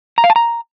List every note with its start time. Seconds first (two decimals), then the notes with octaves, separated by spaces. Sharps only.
0.18 A#5
0.24 F5
0.30 A5
0.36 A#5